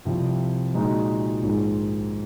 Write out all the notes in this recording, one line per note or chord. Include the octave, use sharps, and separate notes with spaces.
C2 C3 F3
A#2 G#3 D#4 F#4
A#1 G#2 D#3 G#3